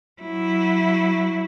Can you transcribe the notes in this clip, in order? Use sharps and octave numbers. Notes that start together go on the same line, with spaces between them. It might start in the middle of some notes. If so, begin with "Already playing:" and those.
F#3 E4